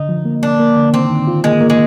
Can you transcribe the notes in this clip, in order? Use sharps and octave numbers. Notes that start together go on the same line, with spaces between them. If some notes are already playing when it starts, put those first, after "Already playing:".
Already playing: D3 D#4
F3
A#3
A#3 D4
A#3
D3
D#3 C4
D#3
F4
G#3 A#3
A#3
G#3